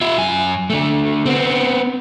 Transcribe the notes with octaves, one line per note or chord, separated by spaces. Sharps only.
F4 E5
F#2 G#5
D3 A3
B3 C4